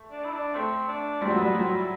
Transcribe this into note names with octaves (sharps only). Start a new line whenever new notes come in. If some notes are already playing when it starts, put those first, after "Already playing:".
Already playing: A3
D4
E4
D4
A3 C4
D4
G3 C4
F#3
G3 B3
F#3 C4
E4